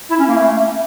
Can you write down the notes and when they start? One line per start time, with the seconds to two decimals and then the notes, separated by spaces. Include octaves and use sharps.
0.09 E4
0.19 C#4
0.28 A#3
0.36 A3